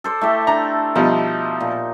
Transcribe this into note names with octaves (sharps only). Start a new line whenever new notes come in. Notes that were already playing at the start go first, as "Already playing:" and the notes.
A4 C5 D5
A3 E4 G4
D4 A#5
B2 F3 G3 D#4
A#2